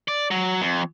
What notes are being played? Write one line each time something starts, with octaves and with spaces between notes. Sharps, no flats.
D5
F#3
F2